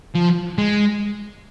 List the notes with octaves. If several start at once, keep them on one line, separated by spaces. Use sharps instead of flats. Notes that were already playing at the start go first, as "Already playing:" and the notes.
F3
G#3